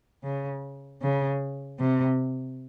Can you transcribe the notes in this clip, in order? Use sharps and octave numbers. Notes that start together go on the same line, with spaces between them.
C#3
C#3
C3